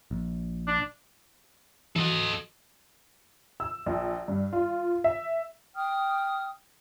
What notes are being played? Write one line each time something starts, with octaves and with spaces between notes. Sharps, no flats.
A#1
D4
E3 F#4 A4 D#5
E6
A#1
G2
F4
E5
G5 D#6 F6